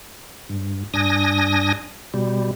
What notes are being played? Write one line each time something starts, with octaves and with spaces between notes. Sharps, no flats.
G2
G2 D4 G#5 D#6 A#6
B2 G3